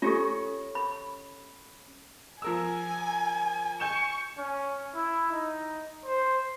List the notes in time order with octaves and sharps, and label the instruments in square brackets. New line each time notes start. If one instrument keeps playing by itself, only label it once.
[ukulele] C#4 [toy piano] F4 G4 A4
[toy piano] B5
[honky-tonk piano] F3 A#4 E6 [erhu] G#5
[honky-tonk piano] G#5 G6 E7 [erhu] C#6
[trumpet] C#4
E4
D#4
C5